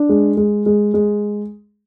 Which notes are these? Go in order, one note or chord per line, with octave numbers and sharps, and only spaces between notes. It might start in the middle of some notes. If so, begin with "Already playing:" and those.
Already playing: D4
G#3
G#3
G#3
G#3